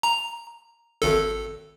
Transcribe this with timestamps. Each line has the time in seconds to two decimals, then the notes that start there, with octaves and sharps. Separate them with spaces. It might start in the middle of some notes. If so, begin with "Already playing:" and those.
0.03 A#5
1.02 G#1 A4